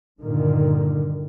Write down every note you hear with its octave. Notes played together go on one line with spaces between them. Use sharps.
G2 A#2 D3 D#3